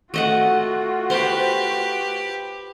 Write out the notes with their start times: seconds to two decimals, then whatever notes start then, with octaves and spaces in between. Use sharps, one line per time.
0.14 A3 F4 F#4 D#5 F#5
1.10 G4 B4 C5